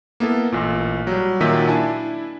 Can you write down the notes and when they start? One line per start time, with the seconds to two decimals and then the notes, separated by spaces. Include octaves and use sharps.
0.20 A#3 B3 E4 A4
0.52 A1 A#2
1.07 F#3 G3
1.40 A#2 D#3 F#3 E5 B6 D#7
1.68 D4 E4 G#5 A5